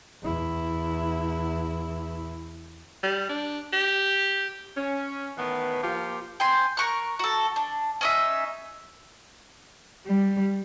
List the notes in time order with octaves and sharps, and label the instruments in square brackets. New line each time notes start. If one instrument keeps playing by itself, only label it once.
[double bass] E2 E4
[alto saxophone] G3
D4
G4
[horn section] C#4
A2 D#3 E3 B3
F3 A#3 F4 G4
[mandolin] G5 G#5 C6
A#4 C#6 F#6
F#4 A4
D4
C#4 D#4 E5
[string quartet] G3